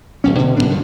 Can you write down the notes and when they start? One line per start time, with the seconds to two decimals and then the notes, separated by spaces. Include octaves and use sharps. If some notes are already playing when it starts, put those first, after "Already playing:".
0.24 D1 B1 C#4
0.39 B2 D3
0.56 F#1 A2 B3 D4
0.69 G2 D3 D#3 F#3